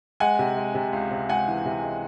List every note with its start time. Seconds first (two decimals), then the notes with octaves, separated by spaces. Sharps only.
0.20 G#3 F#5 G#5
0.39 C3
0.57 G#3
0.75 C3
0.93 C#2
1.11 C3
1.29 C#2 F#5 G#5
1.48 E3
1.65 C3
1.83 G#3